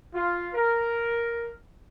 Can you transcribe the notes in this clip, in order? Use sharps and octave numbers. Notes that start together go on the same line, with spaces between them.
F4
A#4